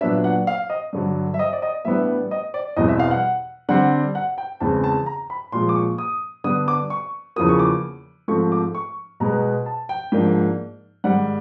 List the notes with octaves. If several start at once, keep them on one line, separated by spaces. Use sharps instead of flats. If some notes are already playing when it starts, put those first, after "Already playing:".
A#2 F#3 B3 D4 E5
F#5
F5
D#5
G2 D3 F#3
E5
D#5
D5
D#5
A2 E3 G3 B3 D4 E5
D#5
D5
E2 B2 G3 C4 D#5
E5
F5
F#5
D3 G3 C4 F#5
F#5
G5
E2 C#3 E3 G#3 C4 A5
A5
A#5
B5
A#2 F3 G#3 C6
D6
C#6
D#6
D3 G3 B3 D4 D#6
D6
C#6
E2 C#3 F3 A#3 D#6
C#6
D6
G#2 F3 A3 C4 C#6
D6
C#6
B2 G#3 B3 A#5
A5
G5
G#2 F3 A#3 D4
G#2 D#3 G3 F#5